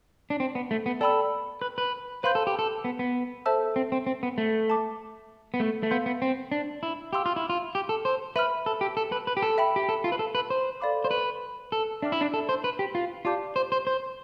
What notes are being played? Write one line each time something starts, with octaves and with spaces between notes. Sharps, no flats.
D4
C4
B3
A3
B3
A4 D5 G5 B5 E6
B4
B4
B4 C5 F5 C6 G6
A4
G4
A4
B3
B3
A4 C5 E5 A5 E6
C4
C4
C4
B3
A3
E5 A5 D6
B3
A3
A3
B3 F5 C6 E6 G6
B3
C4
D4
E4
G4 F5 C6 E6
F4
E4
F4
G4
A4
C5
B4 E5 B5 F6
A4
G4
A4
B4
B4
G4
A4
E5 G5 B5
G4
A4
F4
B4
A4
B4
C5
A4 D5 F5 B5 D6
C5
B4
A4
D4 E5 G5 D6 F6
E4
D4
A4
C5
B4
G4
F4
F4 G4 D5 A5 D6 G6
C5
C5
C5